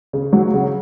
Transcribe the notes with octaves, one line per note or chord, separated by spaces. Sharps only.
C#3
F#3
C#3